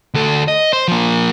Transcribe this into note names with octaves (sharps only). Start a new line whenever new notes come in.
D2 A4
D#5
C5
F3 A#3